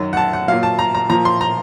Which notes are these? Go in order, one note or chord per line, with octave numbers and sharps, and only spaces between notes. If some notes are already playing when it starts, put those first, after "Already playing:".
Already playing: F#2 D#3 F#3
F#5
A5
F#5
A#2 F#3 F5
A5
A#5
A#5
A#2 F3 A#5
C6
A#5